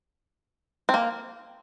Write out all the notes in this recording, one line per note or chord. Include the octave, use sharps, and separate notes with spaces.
C4
A#3